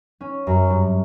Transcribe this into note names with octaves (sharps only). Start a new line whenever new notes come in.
C#4
F#2
G2